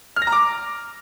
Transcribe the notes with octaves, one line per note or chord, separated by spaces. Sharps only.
F6
A#6
A#5
D6